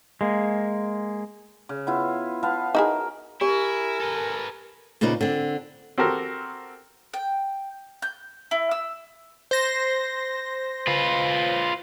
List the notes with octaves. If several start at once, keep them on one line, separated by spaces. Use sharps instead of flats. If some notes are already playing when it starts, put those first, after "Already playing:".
G#3 A#3
C#3
B3 E4 F4
B3 F5 A5
D#4 E4 F#4 G#4 A#4
E4 G4 A#4 G#5
A4 B4
A#2 C#3 A#3 D#4 B4 C5
D3 C4
C4 F#4 G4 A4 A#4
G5
G6
E4
E6
C5 A#6
F4 B4